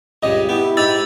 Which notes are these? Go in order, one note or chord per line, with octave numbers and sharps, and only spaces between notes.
C#2 G2 C#3 D#5
B3 E4 G4
G#2 D#4 G4 E6 A6